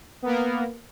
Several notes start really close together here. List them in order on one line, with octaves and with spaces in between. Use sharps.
B3 A#4 A#3